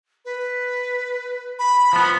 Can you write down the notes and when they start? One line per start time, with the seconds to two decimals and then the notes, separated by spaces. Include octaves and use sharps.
0.25 B4
1.59 B5
1.93 F3 B3